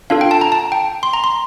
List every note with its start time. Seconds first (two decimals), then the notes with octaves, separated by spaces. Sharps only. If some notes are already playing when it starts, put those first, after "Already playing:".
0.10 D4 F4 A4 F5
0.21 G5
0.31 A5
0.41 A#5
0.52 A5
0.72 G5
1.03 C6
1.13 A#5
1.24 C6